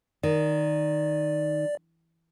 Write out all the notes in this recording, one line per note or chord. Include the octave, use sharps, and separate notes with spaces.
D#3 D5